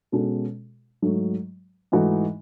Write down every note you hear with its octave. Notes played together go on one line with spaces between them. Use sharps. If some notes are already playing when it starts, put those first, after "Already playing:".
B2 G#3 C#4 F#4 A4
G#2 F#3 A3
G#2 E3 A3 D#4 F#4